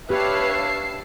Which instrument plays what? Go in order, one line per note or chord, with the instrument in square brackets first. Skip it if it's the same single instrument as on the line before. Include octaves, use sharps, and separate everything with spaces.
[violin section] D4 A5 C7 [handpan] G4 [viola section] B4 C#5 F5 [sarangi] E5